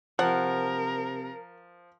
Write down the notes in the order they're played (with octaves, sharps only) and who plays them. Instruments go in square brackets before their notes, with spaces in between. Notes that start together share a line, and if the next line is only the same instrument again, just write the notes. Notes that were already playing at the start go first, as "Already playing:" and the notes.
[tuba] C3 [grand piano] F3 [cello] A#4 [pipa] F#5